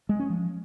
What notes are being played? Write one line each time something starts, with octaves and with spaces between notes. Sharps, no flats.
G#3
C#4
F3